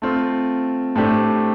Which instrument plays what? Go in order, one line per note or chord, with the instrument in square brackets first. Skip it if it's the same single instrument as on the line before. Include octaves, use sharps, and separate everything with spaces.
[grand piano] A3 C4 F4
A2 A3 D4 G4 C5